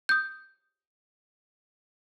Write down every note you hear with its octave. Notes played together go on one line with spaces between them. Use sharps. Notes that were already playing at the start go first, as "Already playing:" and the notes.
D#6 G6